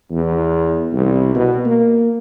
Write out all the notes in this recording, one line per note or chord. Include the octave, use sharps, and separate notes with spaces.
E2
C2
B2
A#3